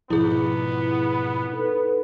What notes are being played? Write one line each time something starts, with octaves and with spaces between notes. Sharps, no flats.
G#2 B2 F3 B3 E4 G#4
D#4 A4 B4